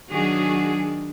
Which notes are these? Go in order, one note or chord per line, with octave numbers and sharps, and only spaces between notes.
D#3 F#3 D4 F#4 G#4